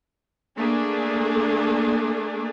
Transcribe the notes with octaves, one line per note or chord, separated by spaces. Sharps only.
A3 A#3 D4 G#4